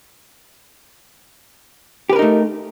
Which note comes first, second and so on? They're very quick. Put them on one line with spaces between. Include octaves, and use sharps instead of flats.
G4 B4 A#4 D#4 A3